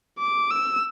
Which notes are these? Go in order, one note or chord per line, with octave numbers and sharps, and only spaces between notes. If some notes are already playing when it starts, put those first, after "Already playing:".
D6
E6